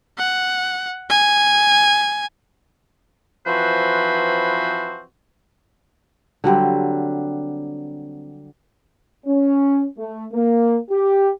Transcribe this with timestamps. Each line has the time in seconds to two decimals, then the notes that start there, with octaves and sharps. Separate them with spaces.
0.18 F#5
1.10 G#5
3.46 E3 F3 C4 F#4 B4 C5
6.44 D3 F#3 G3 C4
9.26 C#4
9.98 A3
10.33 A#3
10.90 G4